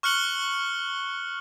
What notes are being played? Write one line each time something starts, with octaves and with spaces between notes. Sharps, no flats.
C#6 F6 F#6 C#7 F#7 G7